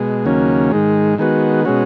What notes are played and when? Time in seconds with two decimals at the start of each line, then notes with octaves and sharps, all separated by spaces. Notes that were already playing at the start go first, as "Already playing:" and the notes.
Already playing: B2 G#3
0.25 D#2 C#3 F#3 A#3 C#4
0.72 G#2 D#3 G#3
1.18 D#3 G#3 B3 F#4
1.65 B2 G#3 C#4 F#4